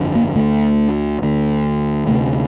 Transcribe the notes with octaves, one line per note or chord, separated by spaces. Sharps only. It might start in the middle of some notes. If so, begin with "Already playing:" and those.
Already playing: G1 F2 D3
A#3
D2 D3 A3
D2 D3
D2 C3 A3